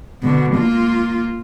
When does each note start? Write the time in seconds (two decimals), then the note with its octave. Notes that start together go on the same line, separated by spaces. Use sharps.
0.23 B2 D3
0.55 A#3 F4